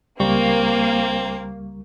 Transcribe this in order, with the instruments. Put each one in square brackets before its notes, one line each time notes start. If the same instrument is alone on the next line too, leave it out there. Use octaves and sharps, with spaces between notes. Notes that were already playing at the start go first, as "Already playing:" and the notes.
[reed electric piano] C#2 G3 C#6 [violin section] A#3 [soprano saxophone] C4